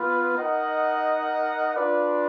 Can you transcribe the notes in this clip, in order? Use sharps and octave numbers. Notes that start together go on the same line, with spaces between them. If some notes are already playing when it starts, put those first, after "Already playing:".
Already playing: B3 F4 B4
D#4 A#4 D#5 F#5
D4 F4 B4 D5